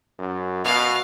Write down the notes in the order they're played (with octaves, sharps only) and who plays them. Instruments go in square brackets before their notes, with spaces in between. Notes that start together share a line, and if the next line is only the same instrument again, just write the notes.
[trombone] F#2
[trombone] B2 [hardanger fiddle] F5